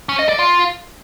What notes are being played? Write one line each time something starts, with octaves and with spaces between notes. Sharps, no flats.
C#4
D#5
D5
F4